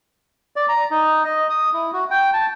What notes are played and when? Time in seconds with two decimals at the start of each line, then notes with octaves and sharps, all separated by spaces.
0.56 D5
0.69 A#5
0.91 D#4
1.24 D#5
1.50 D#6
1.73 E4
1.93 F#4
2.10 G5
2.33 A5